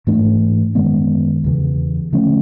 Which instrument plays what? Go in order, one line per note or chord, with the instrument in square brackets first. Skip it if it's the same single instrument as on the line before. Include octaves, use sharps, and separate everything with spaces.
[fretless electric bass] G#2 E3 A3 D4
F#2 D#3 G#3 B3
E2 C#3 E3
D3 F3 A3 C#4